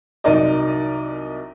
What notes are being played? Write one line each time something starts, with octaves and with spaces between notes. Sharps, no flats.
C2 F#3 D#4 A#4 D5 D#5